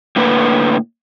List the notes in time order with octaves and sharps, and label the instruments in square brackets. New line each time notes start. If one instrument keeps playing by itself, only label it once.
[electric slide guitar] A2 D3 A#3 B4